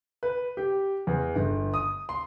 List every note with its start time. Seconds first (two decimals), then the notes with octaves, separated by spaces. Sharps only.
0.23 B4
0.57 G4
1.07 E2
1.35 G1
1.74 D#6
2.09 C6